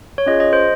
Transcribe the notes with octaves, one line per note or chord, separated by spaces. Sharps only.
C#5
C#4 F4 G#4 D#5
D#5
C5